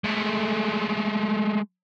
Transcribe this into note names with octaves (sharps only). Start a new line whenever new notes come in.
G#3 A3